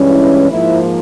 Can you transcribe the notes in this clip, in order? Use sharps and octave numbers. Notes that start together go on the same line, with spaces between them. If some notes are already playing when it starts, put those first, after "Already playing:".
Already playing: G2 E3 G#3 C#4
E4
G#2 F3 A#3 E4